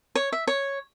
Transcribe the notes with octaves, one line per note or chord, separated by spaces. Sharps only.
C#5
E5
C#5